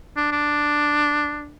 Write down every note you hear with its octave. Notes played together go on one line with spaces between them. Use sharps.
D4
D4